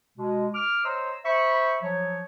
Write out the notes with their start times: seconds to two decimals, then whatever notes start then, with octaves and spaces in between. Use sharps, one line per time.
0.18 B2 G#3
0.54 D6 F6
0.85 C5 C#5 D#5 A#5 C6 E6
1.25 C5 E5 B5 C#6
1.83 F3 F#3 C#5